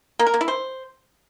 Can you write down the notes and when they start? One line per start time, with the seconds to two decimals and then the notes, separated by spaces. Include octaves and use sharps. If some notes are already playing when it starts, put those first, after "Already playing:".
0.19 A#3
0.26 A#4
0.34 A#3
0.41 E4
0.48 C5